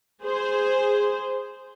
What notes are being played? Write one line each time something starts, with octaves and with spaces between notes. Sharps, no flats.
G#4 C5